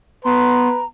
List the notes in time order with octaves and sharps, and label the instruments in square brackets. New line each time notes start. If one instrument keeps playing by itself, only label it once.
[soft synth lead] B3 [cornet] B4 [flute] A#5 [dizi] C6